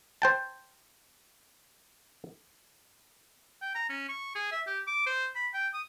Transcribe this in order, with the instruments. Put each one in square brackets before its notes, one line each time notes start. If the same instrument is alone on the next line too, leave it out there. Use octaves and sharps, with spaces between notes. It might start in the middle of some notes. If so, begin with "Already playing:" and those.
[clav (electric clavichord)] C5 G5 A5
[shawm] G5
A#5
C#4
C#6
G#4
E5
G4
D6
C5
B5
G5
D#6